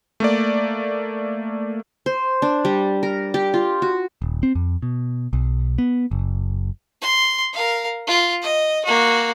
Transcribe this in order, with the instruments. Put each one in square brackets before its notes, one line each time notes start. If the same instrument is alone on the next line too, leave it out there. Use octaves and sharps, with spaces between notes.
[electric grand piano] A3 A#3 D5
[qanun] C5
D4
G3
A#4
G4
F4
F#4
[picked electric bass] D#1
C4
F2
B2
B1
B3
F#1
[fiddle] C6
A#4 F5
F4
D#5
A#3 F#4